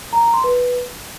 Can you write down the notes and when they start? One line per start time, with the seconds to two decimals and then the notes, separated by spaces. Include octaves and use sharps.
0.13 A#5
0.23 A#5
0.33 C6
0.44 B4